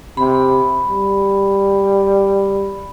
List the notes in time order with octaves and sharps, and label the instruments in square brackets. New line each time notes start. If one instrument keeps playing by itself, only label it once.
[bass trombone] C3 [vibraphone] B5
[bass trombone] G3